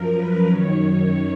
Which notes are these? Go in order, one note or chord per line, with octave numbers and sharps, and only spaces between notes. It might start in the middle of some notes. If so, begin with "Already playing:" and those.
Already playing: F#2 F3 A#4
B4
F#2 D#3 C#5